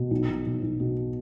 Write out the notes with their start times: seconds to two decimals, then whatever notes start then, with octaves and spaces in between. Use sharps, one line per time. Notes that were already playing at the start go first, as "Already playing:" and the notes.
Already playing: B2
0.11 B1
0.29 B1
0.46 B1
0.62 B1
0.80 B2